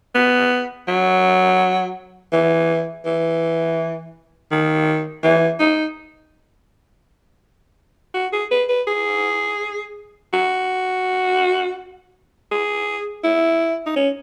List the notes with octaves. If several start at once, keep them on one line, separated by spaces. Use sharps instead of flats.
B3
F#3
E3
E3
D#3
E3
D#4
F#4
G#4
B4
B4
G#4
F#4
G#4
E4
D#4
C#4